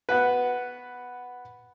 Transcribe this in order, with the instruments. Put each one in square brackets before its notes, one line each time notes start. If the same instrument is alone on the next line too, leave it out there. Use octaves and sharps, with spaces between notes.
[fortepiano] B3 F#4 B4